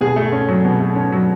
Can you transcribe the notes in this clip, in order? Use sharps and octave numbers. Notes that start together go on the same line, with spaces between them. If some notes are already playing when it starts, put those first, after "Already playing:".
B2 G#4
A3
C#4
F#3
B2
A3
C#4
F#3